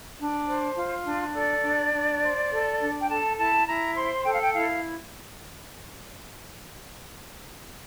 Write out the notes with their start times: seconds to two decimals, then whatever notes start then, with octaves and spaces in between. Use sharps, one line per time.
0.18 D4
0.47 C5
0.76 F4
1.05 D4
1.34 A4 D5
1.63 D4
1.92 D4
2.21 C5
2.51 A4
2.79 D4
2.99 G5
3.08 A4 A5
3.37 E4 A5
3.66 E4 A#5
3.96 C5 C6
4.24 A4 G5
4.33 F5
4.41 G5
4.54 E4 F5